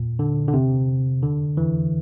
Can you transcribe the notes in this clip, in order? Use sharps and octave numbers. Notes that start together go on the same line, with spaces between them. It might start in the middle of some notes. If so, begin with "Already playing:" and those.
Already playing: A#2
D3
D3
C3
D3
E3